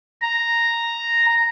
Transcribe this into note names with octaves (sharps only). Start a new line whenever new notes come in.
A#5